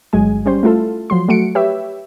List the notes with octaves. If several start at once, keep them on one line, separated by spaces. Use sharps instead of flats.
G1 F#3 G#3 G#5
G3 C#4 C5
A3 E4 F4 A4
F3 F#3 C6
F#3 A3 F#4 C#7 D7
G4 B4 C#5 E5